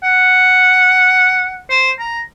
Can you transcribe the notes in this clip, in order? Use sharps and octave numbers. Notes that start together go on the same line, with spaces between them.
F#5
C5
A#5